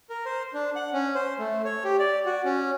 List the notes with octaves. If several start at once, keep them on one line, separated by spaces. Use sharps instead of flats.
A#4
C5
D4
F#5
C#4
C5
A3
C#5
G4
D5
F#4
C#4